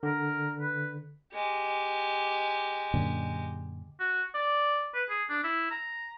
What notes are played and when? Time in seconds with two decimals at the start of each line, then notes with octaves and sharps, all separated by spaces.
0.03 D3 A#4
0.60 B4
1.34 G#3 G4
2.94 F#2 A#2 D3
4.00 F#4
4.35 D5
4.95 B4
5.09 G#4
5.30 D4
5.44 E4
5.71 A#5